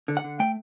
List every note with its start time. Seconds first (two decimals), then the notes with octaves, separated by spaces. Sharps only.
0.08 D3
0.17 F#5
0.24 D3
0.39 A3 G5